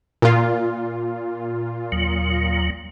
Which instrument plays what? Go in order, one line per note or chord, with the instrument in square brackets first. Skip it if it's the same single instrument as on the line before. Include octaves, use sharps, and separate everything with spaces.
[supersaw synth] A#2 F4
[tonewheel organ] D#2 F#3